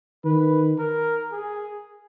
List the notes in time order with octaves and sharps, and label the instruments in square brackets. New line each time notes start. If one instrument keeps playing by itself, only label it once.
[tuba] D#3 [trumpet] B4
[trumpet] A#4
G#4